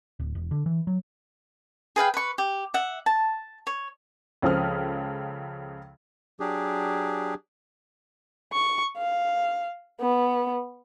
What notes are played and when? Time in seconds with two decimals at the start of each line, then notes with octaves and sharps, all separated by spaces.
0.20 D1
0.35 E1
0.51 D3
0.66 E3
0.87 F#3
1.96 G#4 B4 F5 G5
2.14 B4 C#6
2.38 G4
2.74 E5 F#5
3.06 A5
3.67 C#5
4.42 C#2 C#3 F3 A4 D#6 F6
6.40 F#3 D4 G4 G#4
8.53 C#6
8.97 F5
10.01 B3